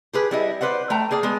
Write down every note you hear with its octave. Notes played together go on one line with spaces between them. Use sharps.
G4 G#4 B4
G3 E4 D#5
B4 C5 D5 F#5
A3 G5 A#5
A#3 G#4 D5
G#3 B3